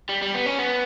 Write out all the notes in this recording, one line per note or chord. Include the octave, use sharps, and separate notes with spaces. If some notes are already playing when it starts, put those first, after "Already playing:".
G3
G3
B3
C#4
B3